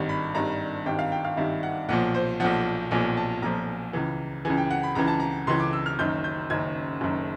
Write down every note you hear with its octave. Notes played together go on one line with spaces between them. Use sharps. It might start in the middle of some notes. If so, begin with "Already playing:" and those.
Already playing: G#1 G2 D#3
B5
G#1 G2 D#3 A#5
G#1 G2 D#3 G5
F5
G5
F5
G#1 G2 D#3 E5
F#5
B1 A#2 F3 F#5
C5
B1 A#2 F3 F#5
B1 A#2 F3 G#5
A5
B1 A#2 F3 A#5
C#2 C#3 E3
C#2 C#3 E3 G#5
G5
F#5
B5
C#2 C#3 E3 A#5
A5
A#5
C#2 C#3 E3 C6
D6
E6
F6
F#1 F#2 D#3 G6
G6
F#1 F#2 D#3 G#6
F#1 F#2 D#3